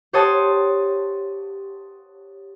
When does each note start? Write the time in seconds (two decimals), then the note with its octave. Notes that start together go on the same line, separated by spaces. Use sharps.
0.13 G4 C5 C#5 F#5 A5 D#6